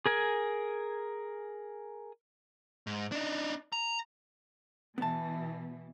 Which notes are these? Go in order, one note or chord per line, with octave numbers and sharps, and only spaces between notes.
G#4 A#4 G#5
G#2
D4 D#4
A#5
B2 E3 B3 A5